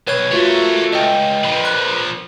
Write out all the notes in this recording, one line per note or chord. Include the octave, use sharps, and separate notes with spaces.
B1 B4 C#5 G#6
A3 F4 F#4 A#4 B4 C#5
C#2 D#5 G5
A#2 F3 A#4 B4
F#6